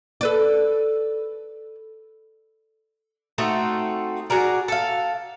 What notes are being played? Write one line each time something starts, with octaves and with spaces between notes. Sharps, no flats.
A4 B4 D5
A3 C4 D#4 F#4
F#4 G#4 A#4 D5
A4 F5